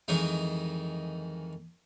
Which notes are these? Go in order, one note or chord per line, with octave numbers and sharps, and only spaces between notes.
F2 D#3 E3 G#3 D#4